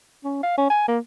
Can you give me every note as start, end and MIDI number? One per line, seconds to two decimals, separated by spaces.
0.24 0.39 61
0.43 0.55 77
0.58 0.68 61
0.70 0.86 80
0.88 0.99 58